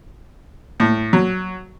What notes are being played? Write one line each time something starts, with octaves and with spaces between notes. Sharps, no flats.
A2
F#3